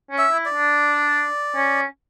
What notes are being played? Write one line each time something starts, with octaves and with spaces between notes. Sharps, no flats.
C#4
E5
E4
D5
D4
C#4